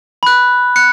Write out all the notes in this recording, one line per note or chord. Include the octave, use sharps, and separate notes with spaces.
B5 F#6
F#6 C#7